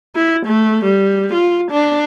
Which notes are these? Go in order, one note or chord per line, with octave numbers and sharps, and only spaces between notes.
E4
A3
G3
F4
D4